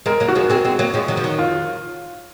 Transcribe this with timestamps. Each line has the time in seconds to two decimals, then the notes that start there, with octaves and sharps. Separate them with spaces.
0.06 G#3 C4 A#4
0.20 F#3 A#3
0.28 F#4
0.35 F3 G#3
0.50 G#3 C4
0.65 G#3 C4
0.79 F#3 A#3
0.94 F3 G#3
1.08 D#3 F#3
1.17 F3
1.24 D#3 F#3
1.39 F4